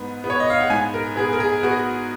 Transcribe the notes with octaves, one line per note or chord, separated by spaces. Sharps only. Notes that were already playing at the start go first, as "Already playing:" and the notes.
Already playing: G#2 B3
B3
C#5
D#5
F5
F#5
G#2 G#5
A#4
B3 G#4
A#4
G#4
B3 F#4